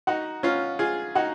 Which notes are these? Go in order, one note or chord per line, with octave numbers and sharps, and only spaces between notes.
D#4 F#4
C#4 F4
F4 G#4
D#4 F#4